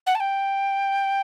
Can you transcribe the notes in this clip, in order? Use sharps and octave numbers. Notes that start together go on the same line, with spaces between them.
F#5
A5
G5